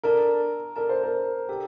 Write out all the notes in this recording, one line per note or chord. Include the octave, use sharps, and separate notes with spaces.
D4 A4 A#4 D5 A5
D4 A4 A#4 D5 A5
C5
A#4
D4 G4 A4 D5 A5